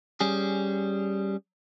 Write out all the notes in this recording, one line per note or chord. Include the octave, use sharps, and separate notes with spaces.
G3 C#4 G#4